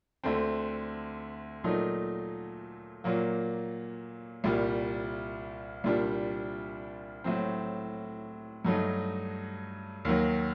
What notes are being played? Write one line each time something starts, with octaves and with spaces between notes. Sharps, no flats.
D2 D3 A3 C4
A#2 F#3 A3 D#4
A#2 F#3 A#3
C2 A#2 G3
C2 A#2 G3 D4
A2 F#3 C4
G2 F#3 A3 D#4
D#2 D#3 F#3